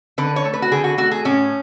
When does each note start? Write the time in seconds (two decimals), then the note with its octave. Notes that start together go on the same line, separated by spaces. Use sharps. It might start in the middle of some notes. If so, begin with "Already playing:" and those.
0.18 D3 B4
0.36 C#5
0.45 A3
0.53 B4
0.62 F#4
0.72 D3 G#4
0.84 F#4
0.98 A3 F#4
1.11 G#4
1.25 A2 C#4